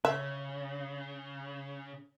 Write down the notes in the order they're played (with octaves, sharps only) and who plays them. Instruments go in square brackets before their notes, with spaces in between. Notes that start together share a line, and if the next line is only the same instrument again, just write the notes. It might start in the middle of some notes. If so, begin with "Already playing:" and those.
[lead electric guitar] C#3 [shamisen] E5